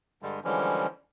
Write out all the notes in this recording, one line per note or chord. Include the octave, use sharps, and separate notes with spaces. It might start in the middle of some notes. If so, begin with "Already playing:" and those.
G2 D3 G3 G#3
D3 E3 F3 G3 G#3 C#4